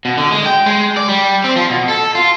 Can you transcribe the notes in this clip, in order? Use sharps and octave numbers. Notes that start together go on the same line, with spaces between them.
B2
D3
G#3
G5
G#3
D5
G3
C4
F3
B2
A4
F4